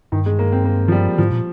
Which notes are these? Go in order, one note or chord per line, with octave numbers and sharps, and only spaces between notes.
G2 D#3
G#3
A#3
C4
A#3
F3
G3
G#2 F3
A#2